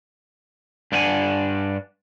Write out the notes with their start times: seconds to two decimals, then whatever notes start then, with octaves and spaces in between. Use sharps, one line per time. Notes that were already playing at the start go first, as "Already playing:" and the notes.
0.92 G2 D4 E4 G4 F#5 G#5